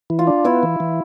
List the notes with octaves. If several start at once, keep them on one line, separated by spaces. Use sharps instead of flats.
E3
F4
D4
B3 E4
E3
E3